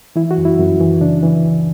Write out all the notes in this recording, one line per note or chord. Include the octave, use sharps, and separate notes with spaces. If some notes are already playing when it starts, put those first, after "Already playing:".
E3 E4
F#4
F#2
E4
F#2
E3
C#3 D4
E3
C#2